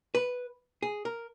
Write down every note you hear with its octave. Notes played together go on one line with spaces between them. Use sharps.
B4
G#4
A#4